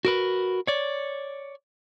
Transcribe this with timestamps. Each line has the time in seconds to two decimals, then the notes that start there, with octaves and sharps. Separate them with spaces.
0.05 F#4 A#4 B4
0.67 C#5 D5